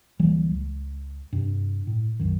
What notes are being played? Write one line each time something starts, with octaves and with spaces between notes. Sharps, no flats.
D1 E3 G3 A#3
C#2
G2 C3
A2
B1 F#2 D#3